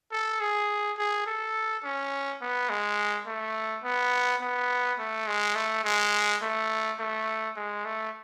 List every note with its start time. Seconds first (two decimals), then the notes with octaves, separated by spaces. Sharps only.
0.12 A4
0.41 G#4
0.98 G#4
1.27 A4
1.84 C#4
2.42 B3
2.70 G#3
3.27 A3
3.84 B3
4.41 B3
4.99 A3
5.27 G#3
5.55 A3
5.85 G#3
6.42 A3
6.99 A3
7.56 G#3
7.85 A3